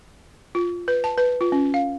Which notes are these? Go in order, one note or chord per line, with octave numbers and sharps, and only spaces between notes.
F4
B4
A5
B4
F4
C#4
F5